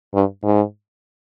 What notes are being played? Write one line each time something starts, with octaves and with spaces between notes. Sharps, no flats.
G2
G#2